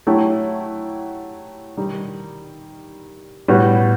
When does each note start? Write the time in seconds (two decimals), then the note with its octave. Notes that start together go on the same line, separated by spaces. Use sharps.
0.07 F#3 A3 E4 G4
1.77 D#3 G3 D#4
3.48 A2 G3 B3 F#4